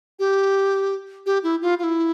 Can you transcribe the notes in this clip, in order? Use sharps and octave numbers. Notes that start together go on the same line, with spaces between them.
G4
G4
E4
F4
F4
E4